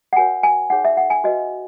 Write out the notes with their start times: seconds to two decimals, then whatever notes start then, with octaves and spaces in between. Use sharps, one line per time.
0.13 F#5
0.16 F#4 A#4 C#5 G#5
0.43 G#5
0.70 D#4 G#4 C#5 F#5
0.85 E5
0.97 F#5
1.10 G#5
1.24 F#4 B4 D#5